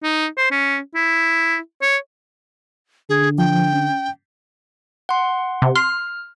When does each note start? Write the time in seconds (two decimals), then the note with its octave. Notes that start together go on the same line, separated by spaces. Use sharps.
0.03 D#4
0.38 C5
0.51 C#4
0.95 E4
1.82 C#5
3.09 D3 G#4
3.38 F3 G5
3.73 C#4
5.09 F#5 C6
5.62 C3
5.76 C6 F6